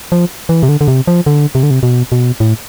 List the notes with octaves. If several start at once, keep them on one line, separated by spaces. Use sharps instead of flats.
F3
E3
C3
D3
D3
C3
F3
D3
C3
D3
C3
B2
B2
A2